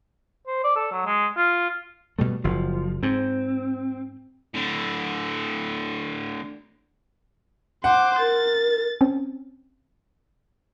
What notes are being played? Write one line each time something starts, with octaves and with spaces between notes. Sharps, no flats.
C5
D5
A4
F#3
G#3
F4
B2 G3 A3
F#1 F3
G#2 C4
A2 D3
C5 F#5 D6
A#4 A6
C4 C#4